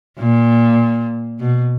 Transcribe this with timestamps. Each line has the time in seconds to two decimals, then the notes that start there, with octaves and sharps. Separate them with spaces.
0.19 A#2
1.40 B2